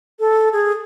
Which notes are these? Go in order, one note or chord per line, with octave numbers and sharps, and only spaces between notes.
A4
G#4